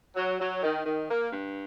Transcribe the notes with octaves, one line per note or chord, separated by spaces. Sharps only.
F#3
F#3
D#3
D#3
A#3
G2